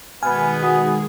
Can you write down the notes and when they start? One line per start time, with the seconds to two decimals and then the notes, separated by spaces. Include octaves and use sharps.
0.23 B2 D#3 G#3 B3 G#4 G#5 B5 F6
0.63 F#4 F#5 D#6